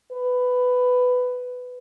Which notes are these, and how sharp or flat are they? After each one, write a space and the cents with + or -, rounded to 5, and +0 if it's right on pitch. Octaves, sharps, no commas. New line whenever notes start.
B4 +10